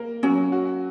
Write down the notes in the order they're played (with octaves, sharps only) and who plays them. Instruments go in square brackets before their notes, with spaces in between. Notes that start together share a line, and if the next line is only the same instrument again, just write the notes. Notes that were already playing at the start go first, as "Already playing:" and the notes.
Already playing: [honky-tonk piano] A#3 A#4
[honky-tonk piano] F#3 [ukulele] C#4
[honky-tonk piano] F#4